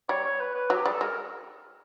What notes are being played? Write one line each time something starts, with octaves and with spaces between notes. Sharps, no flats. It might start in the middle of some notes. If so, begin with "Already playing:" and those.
G3 C#5
C#5
B4
B4
F#3
G4
G3 G#4
A4
G#3 A#4